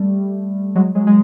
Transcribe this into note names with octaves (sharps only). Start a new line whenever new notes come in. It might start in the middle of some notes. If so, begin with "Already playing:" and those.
Already playing: G3 A3
F#3 G#3
F#3 G#3
G#3